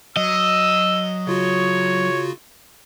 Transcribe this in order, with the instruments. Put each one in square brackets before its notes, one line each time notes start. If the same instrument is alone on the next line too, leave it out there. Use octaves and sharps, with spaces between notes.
[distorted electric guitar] F#3 [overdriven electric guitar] D#5 [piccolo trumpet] E6
[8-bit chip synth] C#3 F4 F#4 [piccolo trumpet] C#5